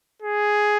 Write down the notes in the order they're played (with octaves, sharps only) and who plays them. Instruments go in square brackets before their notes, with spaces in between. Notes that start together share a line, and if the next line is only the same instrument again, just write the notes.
[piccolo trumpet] G#4